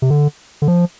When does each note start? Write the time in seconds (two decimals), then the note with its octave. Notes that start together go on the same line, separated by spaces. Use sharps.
0.02 C3
0.10 D3
0.62 D3
0.68 F3